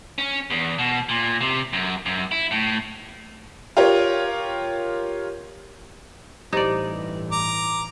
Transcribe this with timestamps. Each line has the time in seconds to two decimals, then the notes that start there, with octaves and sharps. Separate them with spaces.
0.18 C#4
0.50 E2
0.79 B2
1.09 A#2
1.41 C3
1.73 F#2
2.06 F#2
2.32 E4
2.51 A2
3.77 F4 G4 A#4 C#5
6.53 A1 G2 E3 D#4 G4 C5 D5
7.32 A#5 D6